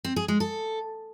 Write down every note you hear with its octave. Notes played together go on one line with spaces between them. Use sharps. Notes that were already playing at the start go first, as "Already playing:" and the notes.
C4
G#4
G#3
A4